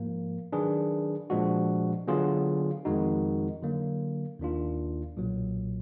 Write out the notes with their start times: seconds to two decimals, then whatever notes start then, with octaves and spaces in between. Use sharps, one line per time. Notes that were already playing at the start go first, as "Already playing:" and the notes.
Already playing: G#2 F3 A#3
0.53 D#3 F#3 D4 G#4 B4
1.30 A#2 F3 G#3 D4 F#4
2.08 D3 F#3 B3 F4 G#4
2.85 F2 D#3 G#3 D#4 F#4
3.62 D3 F#3 A#3
4.39 D#2 D#3 A#3 D4 F4
5.17 B1 A#2 F#3